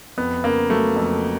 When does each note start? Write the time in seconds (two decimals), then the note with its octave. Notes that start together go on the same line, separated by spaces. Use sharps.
0.18 F2 B3
0.44 C#3 A#3
0.70 F#3 A3
0.96 F2